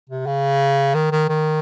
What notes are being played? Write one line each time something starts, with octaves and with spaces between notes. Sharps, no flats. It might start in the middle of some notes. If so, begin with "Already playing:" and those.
C3
C#3
D#3
D#3
D#3